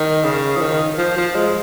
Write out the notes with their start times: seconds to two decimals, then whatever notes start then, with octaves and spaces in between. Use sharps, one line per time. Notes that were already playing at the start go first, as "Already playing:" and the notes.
Already playing: D#3
0.24 C#3
0.57 F3
0.61 D#3
0.98 F3
1.17 F3
1.35 G#3